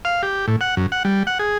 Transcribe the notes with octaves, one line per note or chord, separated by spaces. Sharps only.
F5
G4
A2
F#5
F#2
F#5
G3
F#5
G#4